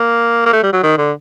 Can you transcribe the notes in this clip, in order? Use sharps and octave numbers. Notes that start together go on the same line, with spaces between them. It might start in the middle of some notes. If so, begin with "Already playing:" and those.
Already playing: A#3
A#3
A3
G3
F#3
D#3
D3